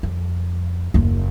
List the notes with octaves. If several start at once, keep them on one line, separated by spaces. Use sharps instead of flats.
F2
F#1 D#2